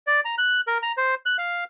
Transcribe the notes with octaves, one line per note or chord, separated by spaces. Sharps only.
D5
A#5
F#6
A#4
A#5
C5
F#6
F5